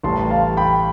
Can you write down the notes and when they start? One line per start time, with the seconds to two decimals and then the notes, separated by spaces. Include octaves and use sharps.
0.04 A1 A2 G3 A5 C6
0.30 F5 A5
0.57 G5 B5